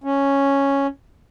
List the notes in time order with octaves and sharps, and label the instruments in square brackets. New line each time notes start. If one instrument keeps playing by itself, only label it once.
[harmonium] C#4